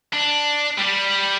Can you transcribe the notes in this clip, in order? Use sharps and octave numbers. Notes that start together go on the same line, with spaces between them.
D4
G3 G4